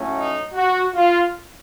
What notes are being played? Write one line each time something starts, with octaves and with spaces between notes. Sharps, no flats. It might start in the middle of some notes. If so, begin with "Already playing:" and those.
Already playing: A2 F#3 A3 C#4
D#4
F#4
F4